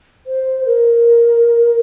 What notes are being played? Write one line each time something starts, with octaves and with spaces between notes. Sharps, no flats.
C5
A#4